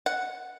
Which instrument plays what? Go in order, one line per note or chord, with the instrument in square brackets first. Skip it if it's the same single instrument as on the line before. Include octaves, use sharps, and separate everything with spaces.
[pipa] F#5